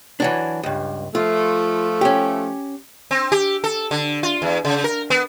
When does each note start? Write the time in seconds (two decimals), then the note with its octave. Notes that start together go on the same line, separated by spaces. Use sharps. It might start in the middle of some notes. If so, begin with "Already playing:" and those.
0.20 E3 F#3 D4
0.63 C#2 G2
1.15 F3 A3 F4
2.01 C#4 G4
3.11 C4
3.32 G4
3.64 A4
3.91 D3
4.23 F4
4.42 E2
4.65 C#3
4.84 A#4
5.10 B3